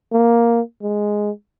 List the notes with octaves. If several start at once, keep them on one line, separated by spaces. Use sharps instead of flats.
A#3
G#3